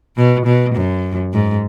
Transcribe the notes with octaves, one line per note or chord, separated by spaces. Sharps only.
B2
B2
F#2
G#2